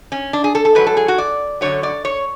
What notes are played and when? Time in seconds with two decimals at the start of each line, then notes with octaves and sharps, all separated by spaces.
0.12 C#4
0.33 D4
0.44 G#4
0.55 A4
0.65 A4
0.75 G#2 F#3 B4
0.87 A4
0.97 G#4
1.08 F#4
1.18 D5
1.61 F#2 D3 F#3 C#5
1.83 D5
2.05 C#5